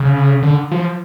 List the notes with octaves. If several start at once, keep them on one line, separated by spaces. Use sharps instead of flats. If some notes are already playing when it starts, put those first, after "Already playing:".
Already playing: C#3
D3
F3